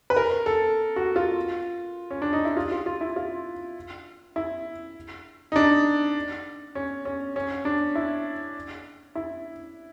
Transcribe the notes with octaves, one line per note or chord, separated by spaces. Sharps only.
B4
A#4
A4
F#4
F4
C#4
D4
D#4
E4
F4
F4
F4
E4
F4
E4
D#4
D4
C#4
C#4
C#4
D4
E4
E4